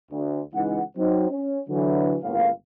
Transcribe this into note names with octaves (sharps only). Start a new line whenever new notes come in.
D2
C#2 E3 G#3 D#4 F#5
F#3 C4 D#4
C#4
D3 E3 F#3
G1 C#2 A2 A#3 F5